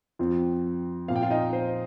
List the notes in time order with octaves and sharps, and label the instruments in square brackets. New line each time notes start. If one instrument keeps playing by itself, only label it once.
[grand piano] F2 F3 C4
A#2 F3 C4 F5
G5
F4 F5
D#4 D#5
C5